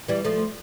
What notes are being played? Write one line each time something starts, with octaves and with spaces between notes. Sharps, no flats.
E3 G3
F3 A3